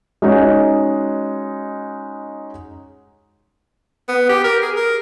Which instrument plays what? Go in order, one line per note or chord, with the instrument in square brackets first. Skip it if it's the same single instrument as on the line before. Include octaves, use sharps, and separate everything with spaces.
[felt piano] G#3 C#4 D#4 F#4
[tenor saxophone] B3
G4
A#4
G#4
A#4